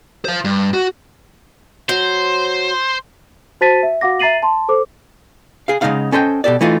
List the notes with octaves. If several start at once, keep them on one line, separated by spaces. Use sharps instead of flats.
C5 F5
G2
F#4
F#3 C5
F#4 C5 A5 A6 B6 D#7
E5
F#4 F5 F#5 D6 A#6
E5 A#5 A6 C7 D#7 F#7
A5 C6
A4 C5 D6
G#4 F5
C#3 F3 G#3 D#4 F5 F#5
C#4 A4 C5 D#5 G5
B2 G4 A4 D5
E3 A3 D#4 F4